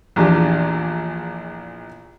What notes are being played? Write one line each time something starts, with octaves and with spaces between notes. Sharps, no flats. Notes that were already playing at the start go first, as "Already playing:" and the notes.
A#1 E2 D4 G4